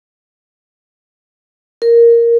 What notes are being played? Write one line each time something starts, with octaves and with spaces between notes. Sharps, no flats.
A#4